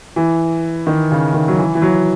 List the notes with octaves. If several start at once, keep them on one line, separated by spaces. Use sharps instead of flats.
E3
D#3
C#3
D#3
F#3
E3
E3
F#3